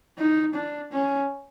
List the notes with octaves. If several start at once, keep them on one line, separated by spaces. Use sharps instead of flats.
D#4
D4
C#4